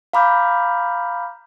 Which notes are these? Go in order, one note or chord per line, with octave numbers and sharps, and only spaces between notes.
F5 A#5 B5 D6 F6 G6